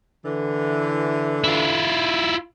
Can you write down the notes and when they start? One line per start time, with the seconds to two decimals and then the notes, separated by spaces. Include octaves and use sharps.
0.25 D3 E3
1.44 E4 F4